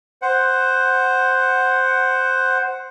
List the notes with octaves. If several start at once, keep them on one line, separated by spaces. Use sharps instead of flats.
C5 F#5